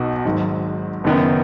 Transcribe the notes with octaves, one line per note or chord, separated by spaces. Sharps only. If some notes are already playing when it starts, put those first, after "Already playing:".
Already playing: B1 B2 B3 D#4 F#4
G#1 G#2 F#3
F#1 F#2 D#3 B3